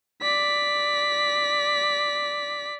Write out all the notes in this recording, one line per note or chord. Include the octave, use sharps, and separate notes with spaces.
D5 B6